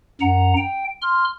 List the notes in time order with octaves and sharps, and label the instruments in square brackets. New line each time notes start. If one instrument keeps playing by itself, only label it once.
[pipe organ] F#2 F#5 A#5
G5
C6 F6